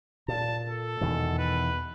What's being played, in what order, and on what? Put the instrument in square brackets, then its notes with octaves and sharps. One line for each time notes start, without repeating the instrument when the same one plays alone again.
[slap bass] A#2 [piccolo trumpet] A5
[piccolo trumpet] A4
[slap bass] E2 B2 D#3
[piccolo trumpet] B4